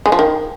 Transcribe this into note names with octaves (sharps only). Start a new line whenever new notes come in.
G#3
F3
D#3